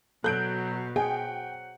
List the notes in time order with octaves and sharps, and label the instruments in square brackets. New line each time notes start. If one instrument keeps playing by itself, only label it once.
[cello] B2 [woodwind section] F#3 [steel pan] A4 [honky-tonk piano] F#6 G6 D7
[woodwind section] F#3 C5 F#5 [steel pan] G#4 [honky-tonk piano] G5